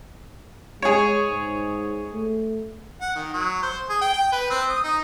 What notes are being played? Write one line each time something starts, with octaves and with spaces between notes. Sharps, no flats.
G#3 G#4 C#5
G#2
A3
F#5
D#3
F#3
C5
G#4
G5
G5
B4
C4
D#6
D#4